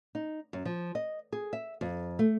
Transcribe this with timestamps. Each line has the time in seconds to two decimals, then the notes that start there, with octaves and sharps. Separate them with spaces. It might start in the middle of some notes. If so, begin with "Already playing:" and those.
0.15 D#4
0.53 F#2
0.65 F3
0.95 D#5
1.32 G#4
1.53 E5
1.81 F2
2.19 A3